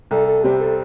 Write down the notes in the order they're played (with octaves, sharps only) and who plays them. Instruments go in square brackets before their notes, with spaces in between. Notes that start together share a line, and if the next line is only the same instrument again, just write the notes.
[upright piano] C2 [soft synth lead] A4
[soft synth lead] A4
[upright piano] C3 G3 C4 [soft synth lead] G4
[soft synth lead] A4